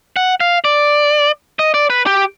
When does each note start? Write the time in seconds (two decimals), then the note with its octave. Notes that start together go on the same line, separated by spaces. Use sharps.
0.16 F#5
0.40 F5
0.65 D5
1.59 D#5
1.74 D5
1.90 B4
2.06 G4